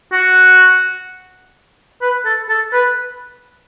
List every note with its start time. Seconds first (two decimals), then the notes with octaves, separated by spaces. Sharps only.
0.12 F#4
2.02 B4
2.25 A4
2.49 A4
2.73 B4